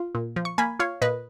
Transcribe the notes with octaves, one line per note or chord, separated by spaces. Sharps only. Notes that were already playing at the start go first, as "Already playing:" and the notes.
Already playing: F4
A#2
F3
C#6
A#3 G#5 B5
F4 C#5 F5
A#2 B4 D#5